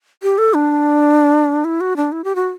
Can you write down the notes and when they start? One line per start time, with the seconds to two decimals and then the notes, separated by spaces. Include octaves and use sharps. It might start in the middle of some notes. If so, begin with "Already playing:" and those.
0.23 G4
0.38 A4
0.54 D4
1.65 E4
1.81 F#4
1.97 D4
2.12 E4
2.24 G4
2.35 F#4